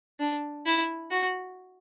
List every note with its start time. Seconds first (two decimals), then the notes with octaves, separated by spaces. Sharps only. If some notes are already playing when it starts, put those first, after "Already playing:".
0.19 D4
0.66 E4
1.10 F#4